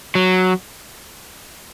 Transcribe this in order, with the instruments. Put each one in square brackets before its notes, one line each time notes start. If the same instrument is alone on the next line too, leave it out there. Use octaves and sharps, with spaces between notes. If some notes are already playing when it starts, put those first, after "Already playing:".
[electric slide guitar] F#3